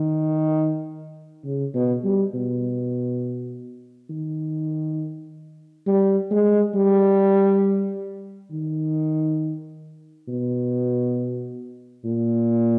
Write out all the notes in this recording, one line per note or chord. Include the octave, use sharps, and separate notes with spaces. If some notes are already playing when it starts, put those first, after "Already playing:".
Already playing: D#3
C#3
B2
G3
B2
D#3
G3
G#3
G3
D#3
B2
A#2